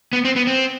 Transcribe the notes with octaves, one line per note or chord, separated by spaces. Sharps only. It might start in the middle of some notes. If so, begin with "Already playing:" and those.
B3
C4
B3
C4